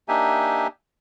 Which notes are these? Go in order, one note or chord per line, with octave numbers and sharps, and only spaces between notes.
A#3 D4 D#4 G4 E5 G#5